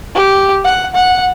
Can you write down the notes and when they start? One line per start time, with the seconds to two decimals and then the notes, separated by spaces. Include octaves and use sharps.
0.15 G4
0.64 F#5
0.95 F#5